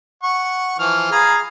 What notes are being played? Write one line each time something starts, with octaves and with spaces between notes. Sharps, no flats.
F#5 C#6
E3 F3 F6
G#4 F5 A#5 B5